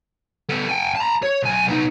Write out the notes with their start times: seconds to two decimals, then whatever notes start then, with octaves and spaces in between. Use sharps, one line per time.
0.49 B3 A4
0.69 G5 G#5
0.96 A5 A#5
1.23 C#5
1.43 B1 G#5
1.68 B3 D#4